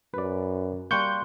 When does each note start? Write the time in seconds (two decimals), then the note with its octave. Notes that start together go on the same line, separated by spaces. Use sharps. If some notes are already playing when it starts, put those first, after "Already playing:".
0.14 F#2 B4 D5
0.91 G3 A#3 C6 C#6 F#6 G6